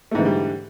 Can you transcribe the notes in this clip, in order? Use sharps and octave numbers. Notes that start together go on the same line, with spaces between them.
G#2 D3 E3 G3 A3